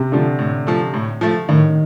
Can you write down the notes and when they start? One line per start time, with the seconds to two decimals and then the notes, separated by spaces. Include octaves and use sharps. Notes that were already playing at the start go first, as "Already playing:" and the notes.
Already playing: C3
0.12 D3 F3 A3
0.39 A2
0.67 F3 A3
0.94 A2
1.21 F3 A3
1.49 A2 D#3